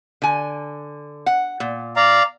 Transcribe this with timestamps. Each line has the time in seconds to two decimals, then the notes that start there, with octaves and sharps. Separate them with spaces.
0.22 D3 G#5
1.26 F#5
1.60 A#2
1.96 D5 F5 A#5